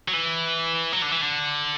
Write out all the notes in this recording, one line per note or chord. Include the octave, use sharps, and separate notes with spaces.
F#3
E3
F#3
D3
E3
D3